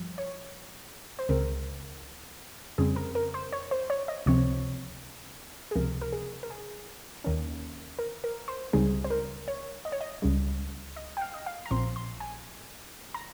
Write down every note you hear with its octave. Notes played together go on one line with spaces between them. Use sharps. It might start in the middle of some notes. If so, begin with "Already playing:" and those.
Already playing: G2 F3
C#5
C5
C#2 C#3 G#3 C4 A#4
F2 C#3 G3 C4 G#4
A#4
A#4
C5
C#5
C5
C#5
D#5
C#2 C3 F3 C4 C#5
G#4
C#2 C3 F3 A#4
A#4
G#4
A#4
G#4
D#2 D#3 A#3 C#4
A#4
A#4
C5
C#2 C#3 G3 C4 D#4 G#4
C5
A#4
C#5
D#5
C#5
D#5
C#2 C#3 G3
D#5
G5
F5
D#5
F5
A#5
A#1 A#2 F3 C4 C6
C6
G#5
A#5